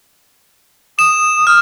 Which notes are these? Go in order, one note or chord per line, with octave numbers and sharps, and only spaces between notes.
D#6 E7
F6